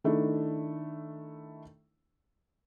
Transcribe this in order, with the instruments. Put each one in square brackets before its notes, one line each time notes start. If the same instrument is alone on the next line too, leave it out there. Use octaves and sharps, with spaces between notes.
[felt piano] D#3 A3 D4 E4